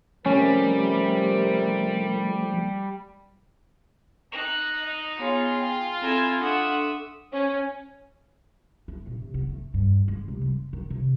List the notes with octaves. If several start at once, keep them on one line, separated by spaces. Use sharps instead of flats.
C3 F3 G3 A3 C#4 A#4
D#4 A#5 F#6
D#5
B3 F4 G#4 C#5 C6
G5
C4 E4 A4 G#5 A#5
D4 A4 E5 F#5 C6 C#6 D#6
C#4
A3
A#2
C3
B3
A3
G2
G#3
C3
G3
G#3
D#3
C3